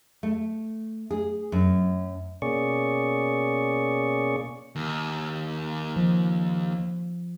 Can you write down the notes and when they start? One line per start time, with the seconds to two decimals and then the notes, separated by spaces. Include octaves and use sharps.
0.23 A3
1.11 G#4
1.52 F#2
2.42 B2 A#3 C#4 G#4 D5 C#6
4.76 D#2
5.96 F3